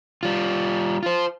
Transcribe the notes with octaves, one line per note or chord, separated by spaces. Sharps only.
G3 F4
F4 C5